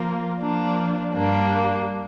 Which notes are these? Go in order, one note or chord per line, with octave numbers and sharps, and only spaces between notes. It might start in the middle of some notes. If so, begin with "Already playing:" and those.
Already playing: F3 A#3 F4 A#4
F3 A#3 D4 F4
G2 G3 A#3 D4